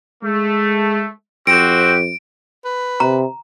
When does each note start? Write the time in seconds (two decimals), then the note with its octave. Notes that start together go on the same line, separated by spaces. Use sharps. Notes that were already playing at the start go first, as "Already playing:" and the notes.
0.23 G#3 A3
1.47 F2 C4 F#4 G4 D7
2.65 B4
3.00 C3 A#5